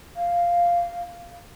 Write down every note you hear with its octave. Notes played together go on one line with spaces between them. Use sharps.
F5